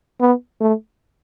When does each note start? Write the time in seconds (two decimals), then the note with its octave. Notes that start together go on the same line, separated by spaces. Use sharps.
0.20 B3
0.60 A3